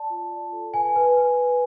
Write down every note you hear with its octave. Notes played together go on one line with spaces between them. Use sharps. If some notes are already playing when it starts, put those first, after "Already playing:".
Already playing: D5 A5
F4
D5
A4
B4 G#5
B4
B4
B4